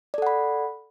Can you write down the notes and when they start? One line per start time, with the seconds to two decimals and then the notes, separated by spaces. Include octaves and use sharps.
0.14 D5
0.18 A4
0.22 F#5
0.27 B5